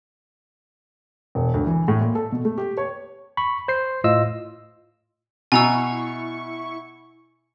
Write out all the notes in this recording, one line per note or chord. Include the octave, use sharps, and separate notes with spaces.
E1
D2
E3
A2
A#2
A4
B2
A3
G4
C#5
B5 C#6
C5 C7
A2 F4 D#5 E6
B2 E4 G#5 A#5 C#6 E6